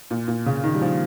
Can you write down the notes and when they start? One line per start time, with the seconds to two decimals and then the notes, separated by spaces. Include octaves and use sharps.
0.11 A#2
0.28 A#2
0.46 C#3
0.64 D#3
0.74 G3
0.82 F3